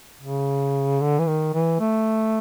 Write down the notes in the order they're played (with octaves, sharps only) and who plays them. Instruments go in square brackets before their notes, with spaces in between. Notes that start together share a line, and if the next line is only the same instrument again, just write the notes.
[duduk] C#3
D3
E3
D#3
E3
A3